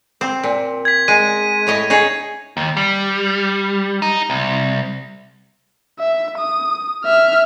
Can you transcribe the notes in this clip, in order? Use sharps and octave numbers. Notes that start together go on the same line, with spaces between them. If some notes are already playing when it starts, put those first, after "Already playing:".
C4
A#2
G#6 B6
G#3 D#7
A2 C#5 D#5
D#4 G#4 C#5
D#2
G3
D#4
C2
E5
D#6
E5 F6